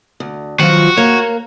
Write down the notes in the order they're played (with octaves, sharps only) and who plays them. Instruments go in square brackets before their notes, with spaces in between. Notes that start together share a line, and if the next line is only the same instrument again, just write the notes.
[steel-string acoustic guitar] D2
[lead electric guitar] D#3 F#3 [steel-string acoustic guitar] F3 F4 [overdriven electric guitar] F#4
[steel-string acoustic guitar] A#3 [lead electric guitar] C#5